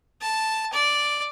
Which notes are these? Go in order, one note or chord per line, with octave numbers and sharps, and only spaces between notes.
A5
D5